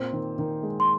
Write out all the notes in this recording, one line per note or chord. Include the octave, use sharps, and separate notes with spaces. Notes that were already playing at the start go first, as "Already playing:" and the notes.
Already playing: A#2 C4
D#3
D#3
G#3
C6